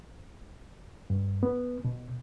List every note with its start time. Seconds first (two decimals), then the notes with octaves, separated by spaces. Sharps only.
1.10 G2
1.43 B3
1.85 B2